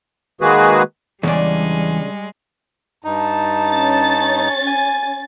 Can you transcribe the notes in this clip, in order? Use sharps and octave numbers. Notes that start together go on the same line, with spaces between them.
D#3 G#3 A#3 F#4 G#4 B4
E2 C#3 G3 G#3 C#4 D4
G2 D#4 A5
C#4 A6
G#5